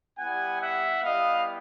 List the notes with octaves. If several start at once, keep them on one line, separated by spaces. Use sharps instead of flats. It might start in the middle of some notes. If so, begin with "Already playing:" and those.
G3 B3 E4 G4 F#5 G#5
E5 F#5
G3 B3 E4 G4 D#5 F5